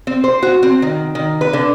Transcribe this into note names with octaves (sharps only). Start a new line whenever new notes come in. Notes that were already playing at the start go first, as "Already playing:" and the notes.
C4
C5
F#4
C4
D#3
D#3
B4
D3